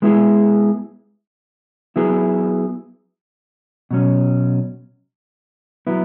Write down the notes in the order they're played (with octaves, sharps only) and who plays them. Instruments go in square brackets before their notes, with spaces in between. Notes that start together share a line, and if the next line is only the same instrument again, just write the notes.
[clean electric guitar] G#3 B3 E4 G#4
F#3 B3 E4 G#4
B2 F#3 C#4
F#3 B3 E4